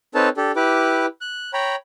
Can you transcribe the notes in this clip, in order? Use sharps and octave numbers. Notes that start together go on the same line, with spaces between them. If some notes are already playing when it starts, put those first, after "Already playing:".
C4 D#4 A4 B4 C#5 A5
D4 G4 A4
E4 G4 B4 D6
F#6
C#5 G5 A#5 B5